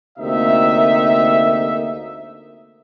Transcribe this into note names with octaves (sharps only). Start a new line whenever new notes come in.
D2 C3 A#3 D#4 E5